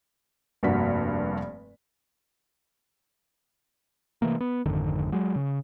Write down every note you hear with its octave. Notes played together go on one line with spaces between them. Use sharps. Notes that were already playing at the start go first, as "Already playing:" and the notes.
F1 G2 A#3 F#4 B6
C3 E3 A3 A#3
B3
G#1 F2 D3 D#3
F#3 G#3
C#3